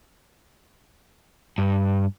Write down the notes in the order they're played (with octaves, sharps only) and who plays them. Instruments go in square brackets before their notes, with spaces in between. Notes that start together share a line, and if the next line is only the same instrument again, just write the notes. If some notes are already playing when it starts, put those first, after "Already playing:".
[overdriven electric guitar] G2